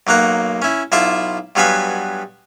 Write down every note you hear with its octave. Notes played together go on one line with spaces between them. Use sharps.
B1 F#3 A#3 F#5 A#5
C#4 E4
B1 E4 F4 E5 A5 D6
G2 F#3 B3 F5 G#5 B5